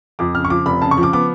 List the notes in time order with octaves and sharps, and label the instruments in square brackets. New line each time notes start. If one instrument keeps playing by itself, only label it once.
[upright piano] F2 D6
C#3 F6
C#6
F3 D6
F1 B5
C#3 A5
C#6
F3
D6
B3 D6